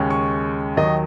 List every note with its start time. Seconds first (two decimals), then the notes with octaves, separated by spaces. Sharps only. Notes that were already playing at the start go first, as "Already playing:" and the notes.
Already playing: D#2 C#3 G#3 C#4
0.10 C#6
0.77 D#2 D#3 F#3 D#5